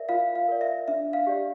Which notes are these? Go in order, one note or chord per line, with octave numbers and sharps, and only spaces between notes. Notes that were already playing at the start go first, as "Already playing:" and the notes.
Already playing: A#4 D5 E5
F4 F5
F5
A#4 D5
E5
D4 E5
F5
G4 D5